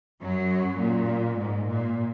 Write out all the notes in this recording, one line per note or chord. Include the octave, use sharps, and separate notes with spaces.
F#2 F#3
A#2
G#2
A#2